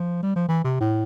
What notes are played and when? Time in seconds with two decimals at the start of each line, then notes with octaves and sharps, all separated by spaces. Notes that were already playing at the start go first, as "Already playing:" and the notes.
Already playing: F3
0.23 G3
0.35 F3
0.49 E3
0.64 C3
0.80 A2